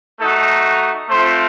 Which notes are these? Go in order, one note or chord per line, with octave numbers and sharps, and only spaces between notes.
A3 D#4 F#4 A4
A3 C4 F4 C5